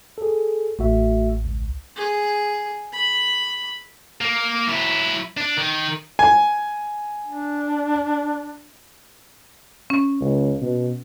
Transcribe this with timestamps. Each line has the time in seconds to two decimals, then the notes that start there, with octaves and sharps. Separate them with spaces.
0.18 G#4 A4
0.79 A1 A3 F#4 E5
1.45 C#2
1.96 G#4
2.93 B5
4.21 A#3
4.68 F#3 E4
5.37 D4
5.57 D#3
6.19 G#5
7.26 D4
9.90 C#4
10.21 C#2
10.62 B2